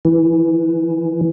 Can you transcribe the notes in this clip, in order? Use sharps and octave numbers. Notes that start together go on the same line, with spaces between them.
E3